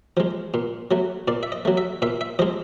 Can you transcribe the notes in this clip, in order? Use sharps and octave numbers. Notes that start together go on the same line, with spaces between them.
F3 G#3
A#2
F#3 A3
A#2 D5
E5
D#5
F#3 A3
E5
A#2 E5
E5
F3 G#3 D#5